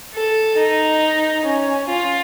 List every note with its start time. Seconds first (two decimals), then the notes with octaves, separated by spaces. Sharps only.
0.14 A4
0.58 D#4
1.45 C#4
1.90 F4